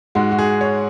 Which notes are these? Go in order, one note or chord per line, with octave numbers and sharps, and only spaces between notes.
G#2 G#3 F#4
F#4
G#4
C#5